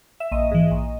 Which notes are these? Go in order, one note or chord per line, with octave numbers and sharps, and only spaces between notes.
E5
A#1 D#5
G#2 E3
A#1